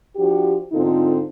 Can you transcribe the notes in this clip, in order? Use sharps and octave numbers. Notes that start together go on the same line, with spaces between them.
F3 D4 F#4 G4
G#2 D3 C4 D#4 F4 A4